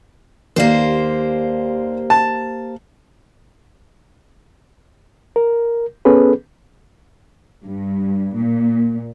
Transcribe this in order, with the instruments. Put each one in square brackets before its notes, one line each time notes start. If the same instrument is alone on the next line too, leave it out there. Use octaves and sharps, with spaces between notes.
[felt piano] D#2 D5 F5 [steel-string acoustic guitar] A#3 G4 C5
[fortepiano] A5
[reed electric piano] A#4
B3 C#4 G#4 A4 B4
[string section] G2
A#2